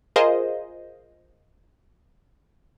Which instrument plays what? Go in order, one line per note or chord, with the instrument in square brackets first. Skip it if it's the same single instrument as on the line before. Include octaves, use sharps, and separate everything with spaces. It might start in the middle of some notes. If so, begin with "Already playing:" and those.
[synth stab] F4 G#4 A#4 C5 D#5